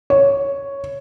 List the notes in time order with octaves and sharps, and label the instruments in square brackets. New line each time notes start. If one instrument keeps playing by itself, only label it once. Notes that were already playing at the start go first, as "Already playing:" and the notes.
[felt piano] C#5